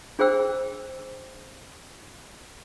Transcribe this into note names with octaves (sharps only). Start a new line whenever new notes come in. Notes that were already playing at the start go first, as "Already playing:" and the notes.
D4 G#4 C5 G5 E6